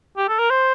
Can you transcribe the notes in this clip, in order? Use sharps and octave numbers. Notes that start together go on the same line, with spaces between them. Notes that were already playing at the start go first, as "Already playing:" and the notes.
G4
A4
A#4
C5